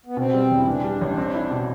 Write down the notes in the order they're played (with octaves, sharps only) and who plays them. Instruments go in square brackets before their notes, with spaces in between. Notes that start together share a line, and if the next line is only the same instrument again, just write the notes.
[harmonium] B3
[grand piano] B2 [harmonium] C4
[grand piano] G3
E1
[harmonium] E4
[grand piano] E3 [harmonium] D4
[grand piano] G3
A1
C4
E4
B2